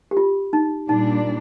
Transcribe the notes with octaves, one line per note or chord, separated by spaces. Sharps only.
G4
F4
D#4
A#2 G3 D4 D#4